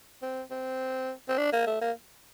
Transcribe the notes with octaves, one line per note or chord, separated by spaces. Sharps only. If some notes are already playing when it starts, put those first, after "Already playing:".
C4
C4
C4
D4
A#3
A3
A#3